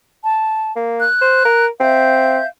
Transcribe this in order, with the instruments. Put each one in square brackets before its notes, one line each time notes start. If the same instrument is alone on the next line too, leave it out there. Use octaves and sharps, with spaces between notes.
[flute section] A5
[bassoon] A#3
[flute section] F#6
[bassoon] C5
A#4
[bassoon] C4 [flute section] E5 F5 G6